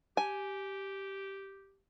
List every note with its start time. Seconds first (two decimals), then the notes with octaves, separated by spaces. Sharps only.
0.17 G4 G#5